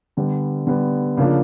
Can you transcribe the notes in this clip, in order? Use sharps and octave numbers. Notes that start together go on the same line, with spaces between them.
D3 G3 B3
D3 G3 B3
C#3 F3 A#3 D4 F4